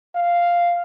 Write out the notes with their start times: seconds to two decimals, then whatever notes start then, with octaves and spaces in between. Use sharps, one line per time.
0.15 F5